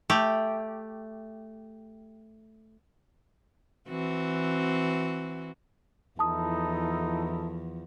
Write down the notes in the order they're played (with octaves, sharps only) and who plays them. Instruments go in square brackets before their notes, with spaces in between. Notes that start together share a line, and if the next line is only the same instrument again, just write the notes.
[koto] A3 G4
[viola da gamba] E3 C4 F#4
[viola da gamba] E2 F3 [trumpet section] D#4 E4 A4 [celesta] A5 D#6